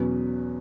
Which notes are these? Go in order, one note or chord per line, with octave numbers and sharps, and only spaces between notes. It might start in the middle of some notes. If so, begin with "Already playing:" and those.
Already playing: E2 B2 F#3 C#4 B4